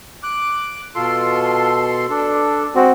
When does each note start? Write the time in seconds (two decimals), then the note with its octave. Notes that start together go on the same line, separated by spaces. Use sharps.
0.23 D6 F#6
0.95 B2 F4 A4 C6
2.10 D4 A4
2.75 G#3 C4 F#4